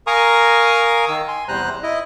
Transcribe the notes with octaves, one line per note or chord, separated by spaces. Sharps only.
A#4 F5 G#5 A#5 C#6 D#6
D#3 E6
G#5 C6
E2 C3 G3 C5 A#5 F#6
E4 D#5